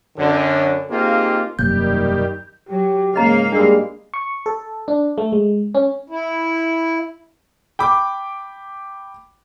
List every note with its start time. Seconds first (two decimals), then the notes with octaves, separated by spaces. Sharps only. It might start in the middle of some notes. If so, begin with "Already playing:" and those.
0.17 F#2 D3
0.90 A#3 C4 D#4 F4 G4 G#4
1.59 E1 F#2 C3 D#3 G3 A#3 G4 G6
2.69 F#3 G4
3.14 G#2 C#3 A#3 G#4 D#5 F5 A#5
3.52 G3 G#3 D4 E6
4.14 C#6
4.46 A4
4.88 D4
5.18 A3
5.32 G#3
5.75 C#4
6.10 E4
7.79 G5 B5 D6